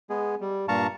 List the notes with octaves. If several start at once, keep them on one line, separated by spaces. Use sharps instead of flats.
G#3 B3 G#4
G3
G2 A#2 F5 A5 A#5 C#6